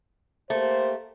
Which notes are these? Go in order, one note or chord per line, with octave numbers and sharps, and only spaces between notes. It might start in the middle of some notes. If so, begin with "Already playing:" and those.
A3 A#3 G4 C5